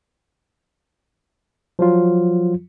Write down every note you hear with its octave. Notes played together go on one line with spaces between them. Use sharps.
F3 F#3 F4